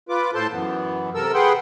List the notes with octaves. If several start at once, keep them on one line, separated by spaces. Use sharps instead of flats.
F4 B4 D6
A2 A4 C5 A5 C6
F#2 E3 B3
C3 A4 A#4 E6
G#4 B4 F#5 G5 C6